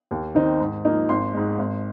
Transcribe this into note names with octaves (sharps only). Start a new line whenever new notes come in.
D#2
D#3 C4 D#4
G#2
F3 A#3 D#4
G#1 C6
G#2 G#3
G#1